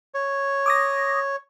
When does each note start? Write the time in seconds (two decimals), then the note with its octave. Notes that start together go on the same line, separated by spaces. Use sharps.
0.14 C#5
0.66 D6 D#6 A#6